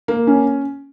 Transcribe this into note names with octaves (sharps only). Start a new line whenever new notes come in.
A#3
C#4